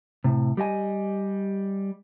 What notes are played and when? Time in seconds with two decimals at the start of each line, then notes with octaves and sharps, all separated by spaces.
0.24 A2 C3
0.57 G3 G4 D#5 G#5